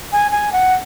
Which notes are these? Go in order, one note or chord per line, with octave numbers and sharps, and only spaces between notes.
G#5
G#5
F#5